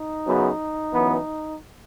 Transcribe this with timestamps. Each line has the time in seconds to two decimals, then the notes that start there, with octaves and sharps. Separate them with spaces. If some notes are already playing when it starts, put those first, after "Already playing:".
Already playing: D#4
0.27 F#2 C#3 F#3 B3
0.93 F#2 E3 B3